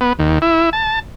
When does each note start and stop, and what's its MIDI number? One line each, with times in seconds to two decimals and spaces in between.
0.01 0.13 59
0.19 0.39 39
0.42 0.70 64
0.73 0.99 81